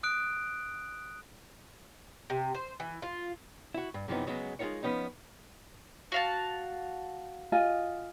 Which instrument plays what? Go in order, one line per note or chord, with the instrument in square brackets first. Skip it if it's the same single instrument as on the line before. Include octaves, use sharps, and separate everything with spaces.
[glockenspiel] D#6 F#6 D7
[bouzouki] C3
C5
E3
F4
[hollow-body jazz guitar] E4 F#4
G2
F#2 C3 E3 F3 B3 D#4
C#3 F#3 G#3 B3
G#3 D#4 F4 A#4 C#5
F3 B3 C#4 D#4
[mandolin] F#4 F5 A5
[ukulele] F4 D#5 G#5